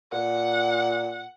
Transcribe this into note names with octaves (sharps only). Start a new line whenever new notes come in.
A#2 F#5